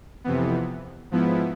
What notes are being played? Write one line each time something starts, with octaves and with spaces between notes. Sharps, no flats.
F2 C3 E3 B3
G#2 F3 B3 E4